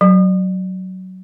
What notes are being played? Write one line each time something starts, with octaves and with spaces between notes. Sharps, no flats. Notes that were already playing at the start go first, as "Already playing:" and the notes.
F#3